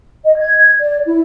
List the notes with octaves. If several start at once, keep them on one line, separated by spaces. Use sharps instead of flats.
D#5
G#6
D5
E4